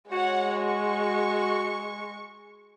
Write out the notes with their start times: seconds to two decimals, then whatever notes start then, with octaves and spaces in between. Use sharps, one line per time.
0.12 G#3 F#4 C#5 F#5
0.62 C#6